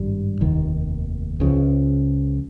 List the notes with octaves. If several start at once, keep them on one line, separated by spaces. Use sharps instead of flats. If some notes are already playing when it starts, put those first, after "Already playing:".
Already playing: G#1 G2 G3
F1 D#2 D#3
C#2 C#3 F3